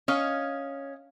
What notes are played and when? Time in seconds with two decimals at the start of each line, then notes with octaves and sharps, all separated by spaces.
0.08 C#4 D#5 F5 C#6